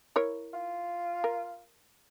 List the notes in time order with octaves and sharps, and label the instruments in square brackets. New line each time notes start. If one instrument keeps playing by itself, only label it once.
[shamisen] E4 A#4 C#5
[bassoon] F4
[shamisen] A#4